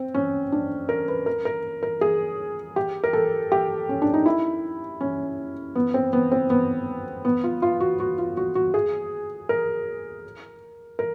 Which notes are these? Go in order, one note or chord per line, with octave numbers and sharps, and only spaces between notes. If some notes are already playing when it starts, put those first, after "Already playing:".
Already playing: C4
C#4
D4
A#4
B4
A#4
A#4
A#4
G#4
G4
A#4
A4
G4
C#4
D4
D#4
E4
C#4
B3
C4
B3
C4
B3
B3
F4
F4
F#4
F#4
F4
F#4
F#4
G#4
A#4
A#4